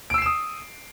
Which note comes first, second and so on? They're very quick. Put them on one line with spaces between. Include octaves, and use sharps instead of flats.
D7 E6 C7 E7 D#6